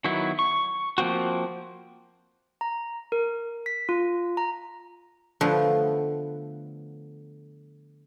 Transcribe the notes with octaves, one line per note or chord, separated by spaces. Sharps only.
D#3 F#3 B3 E4
C#6
F3 A#3 C4 F#4
A#5
A#4
B6
F4
A#5
D3 F3 A3 B3